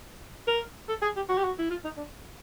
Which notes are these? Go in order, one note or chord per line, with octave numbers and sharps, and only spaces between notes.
A#4
A4
G#4
G4
F#4
G4
F#4
E4
F4
D#4
D4